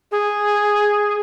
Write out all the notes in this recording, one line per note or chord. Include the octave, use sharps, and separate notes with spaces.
G#4